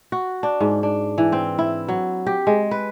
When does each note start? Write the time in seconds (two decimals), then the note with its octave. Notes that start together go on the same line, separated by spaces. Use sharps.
0.12 F#4
0.43 D4
0.60 G#2
0.83 D4
1.18 E3
1.32 C4
1.59 E4
1.88 F#3
2.27 G4
2.47 G#3
2.71 B4